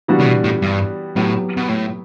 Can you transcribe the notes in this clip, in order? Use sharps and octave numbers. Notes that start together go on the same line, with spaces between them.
E3 G3 B3 D4 F#4
C#3
B2
A2
G2
A2 F#3 B3 E4 G4
B2
A2